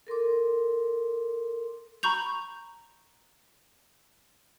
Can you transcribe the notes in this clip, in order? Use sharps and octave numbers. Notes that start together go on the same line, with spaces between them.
A4 A#4 C6 D6
A#5 B5 C#6 G6 F7